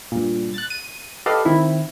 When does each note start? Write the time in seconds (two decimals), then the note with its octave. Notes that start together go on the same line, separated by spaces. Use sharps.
0.12 G2 A#2
0.54 F#6 A6
0.70 D#7
1.26 G4 A4 B4 D5 D#5 F5
1.45 D#3 C4 E4